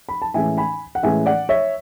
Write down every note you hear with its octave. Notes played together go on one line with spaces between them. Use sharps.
B5
A5
A2 E3 G#3 C#4 E5 G#5
G#5 B5
F#5
A2 E3 G#3 C#4 E5 G#5
D5 F#5
C#5 E5